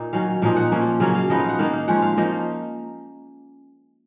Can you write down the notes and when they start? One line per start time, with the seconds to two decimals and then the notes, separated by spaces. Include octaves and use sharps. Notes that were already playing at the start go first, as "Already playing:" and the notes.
Already playing: A#2 A#3 D#4
0.13 D#3 F#3 C#4 F5
0.42 A#2 F3 A#3 D#4 F5
0.56 F#5
0.72 F3 A#3 C#4
1.00 C#3 F#3 A#3 C#4 F5
1.15 F5
1.30 F3 B3 D#4 D#5
1.39 F5
1.49 F#5
1.59 D#3 A#3 D#4 F5
1.73 F5
1.88 F3 G#3 C#4 F#5
2.02 F5
2.17 F3 A#3 D#4 D#5